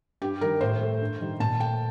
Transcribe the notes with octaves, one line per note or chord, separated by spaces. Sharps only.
G2 G4
D#3 G3 A#4
A2 C5
A3
G2
D#3 G3
A#2 A5
A3 G5